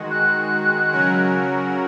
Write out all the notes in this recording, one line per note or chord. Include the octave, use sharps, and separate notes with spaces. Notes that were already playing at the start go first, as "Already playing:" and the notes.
Already playing: D#3 G#3 F#4
F#6
C#3 F#3 C#4 F#4 A#4